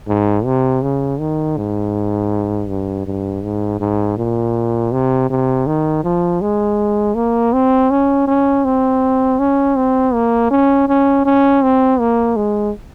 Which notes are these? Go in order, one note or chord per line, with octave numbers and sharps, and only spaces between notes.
G#2
C3
C#3
D#3
G#2
G2
G2
G#2
G#2
A#2
C3
C3
D#3
F3
G#3
A#3
C4
C#4
C#4
C4
C#4
C4
A#3
C#4
C#4
C#4
C4
A#3
G#3